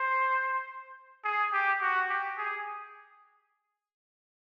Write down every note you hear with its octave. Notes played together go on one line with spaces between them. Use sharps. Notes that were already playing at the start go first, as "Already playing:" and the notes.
Already playing: C5
G#4
G4
F#4
G4
G#4